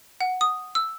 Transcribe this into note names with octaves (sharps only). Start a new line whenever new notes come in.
F#5
D#6
E6